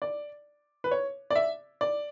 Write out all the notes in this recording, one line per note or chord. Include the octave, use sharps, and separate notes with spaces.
D5
B4
C#5
D5
E5
D5